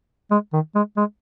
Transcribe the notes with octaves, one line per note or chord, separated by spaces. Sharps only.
G#3
D#3
G#3
G#3